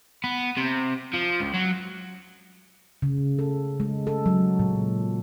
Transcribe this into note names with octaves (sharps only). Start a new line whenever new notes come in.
B3
C3
F3
C#2
F#3
C#3
A4
G#3
A4
F#3
A#2